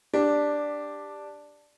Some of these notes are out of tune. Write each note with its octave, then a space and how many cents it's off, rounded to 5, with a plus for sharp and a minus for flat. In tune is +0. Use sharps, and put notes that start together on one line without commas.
D4 +0 G4 +15